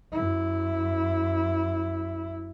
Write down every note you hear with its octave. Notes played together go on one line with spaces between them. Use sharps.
F#2 E4